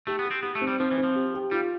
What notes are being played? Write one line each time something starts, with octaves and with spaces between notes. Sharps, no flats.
A3 G4
B3
G4
C4
B3 G4
A3
C4
G3
F3 C4
E3
C4
F3
G4
G4
G3 F4